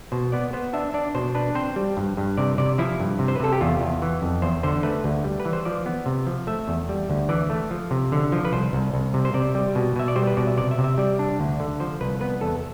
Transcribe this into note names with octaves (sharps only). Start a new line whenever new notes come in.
B2 C5
B3 D5
B3 C5
D4 E5
D4 D5
B2 C5
D4 B4
C4 C5
G3
G2
G2
C3 D5
C3 D5
F3 E4
G2
C3
C5
B4
C3 A4
G4
E2 F4
E2
E3
F2
E2 C5
D3 C5
A3 B4
D2
G3
B4
E3
C5
F3 D5
B3
C3
F3
A3 E5
E2
G3
D2
E3 D5
A3
F3
C3
D3
F3
B4
C2 C5
C2
C2
C3
C5
C3 D5
G3
B2
B2 E5
D5
G3 C5
B4
B2 D5
E5
C3 D5
E5
C3
E5
G3 D5
D4
D2
D3
F3 C5
C2 B4
B3 B4
E2 A4